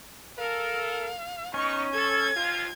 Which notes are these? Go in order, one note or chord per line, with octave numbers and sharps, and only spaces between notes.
A4 A#4 F5
B3 C#4 D#4 C#6
A4 G#6
D#2 F3 F4